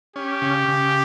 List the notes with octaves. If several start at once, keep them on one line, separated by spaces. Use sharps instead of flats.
C#4 G4
C#3
C#3